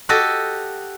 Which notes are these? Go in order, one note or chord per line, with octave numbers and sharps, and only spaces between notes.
F#4 G4 A4 D#5